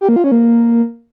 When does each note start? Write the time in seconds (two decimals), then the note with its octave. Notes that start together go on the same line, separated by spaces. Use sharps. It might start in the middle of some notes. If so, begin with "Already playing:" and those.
0.01 G4
0.09 A#3
0.16 F4
0.24 C#4
0.32 A#3